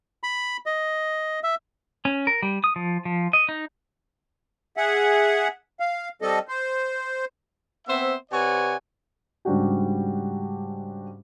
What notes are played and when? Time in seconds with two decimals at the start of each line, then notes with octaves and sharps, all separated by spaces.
0.23 B5
0.66 D#5
1.43 E5
2.05 C#4
2.27 A#4
2.43 G3
2.64 D#6
2.76 F3
3.05 F3
3.33 D#5
3.49 D#4
4.77 G#4 E5 F#5
5.80 F5
6.22 G3 C4 A4 D#5
6.48 C5
7.87 B3 C4 C5 E5
8.31 C3 B4 C#5 D5 F#5 G#5
9.45 G#2 C#3 G3 D4 F#4 G4